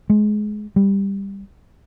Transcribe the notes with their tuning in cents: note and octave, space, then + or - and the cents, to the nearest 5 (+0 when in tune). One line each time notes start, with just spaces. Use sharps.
G#3 +20
G3 +10